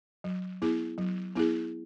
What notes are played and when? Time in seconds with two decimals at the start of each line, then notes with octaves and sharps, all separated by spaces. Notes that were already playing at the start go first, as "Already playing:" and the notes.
0.24 F#3
0.62 B3 E4 G#4
0.98 F#3
1.35 B3 E4 G#4